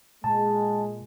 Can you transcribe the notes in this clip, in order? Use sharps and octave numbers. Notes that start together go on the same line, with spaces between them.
A#2 G#3 A5